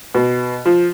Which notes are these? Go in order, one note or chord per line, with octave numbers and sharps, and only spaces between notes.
B2
F3